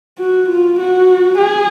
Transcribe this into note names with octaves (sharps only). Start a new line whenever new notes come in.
F#4
F4
F#4
G#4